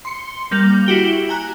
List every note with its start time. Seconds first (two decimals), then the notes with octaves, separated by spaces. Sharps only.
0.05 C6 C#7
0.51 G3 A#3 G6 F7
0.86 E4 F#4 G4 G7
1.29 G#5 A#5 F#6